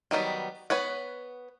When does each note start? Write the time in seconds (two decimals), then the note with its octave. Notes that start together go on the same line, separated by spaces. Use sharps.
0.11 D#3 F#3 G3 B3
0.70 B3 B4 C#5 F#5